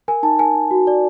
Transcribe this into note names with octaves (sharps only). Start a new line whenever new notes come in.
A#4 G#5
D#4 A5
A#4 G#5
D#4
F#4
D5